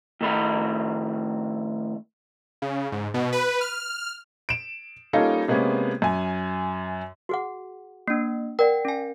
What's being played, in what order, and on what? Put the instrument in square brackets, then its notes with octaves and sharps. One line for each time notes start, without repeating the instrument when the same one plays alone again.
[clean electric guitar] A2 D#3 A3 B5
[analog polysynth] C#3
G#2
B2
B4
F6
[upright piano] D7 E7
G3 A#3 C#4 D#4 F4 A4
C3 G#3 A#3 B3 C#4
F#2 G#5
[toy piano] F#4 G#4 F#5
[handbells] A#3 D4
[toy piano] A#4 D5 F#5 [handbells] G5
[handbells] C#4 G#5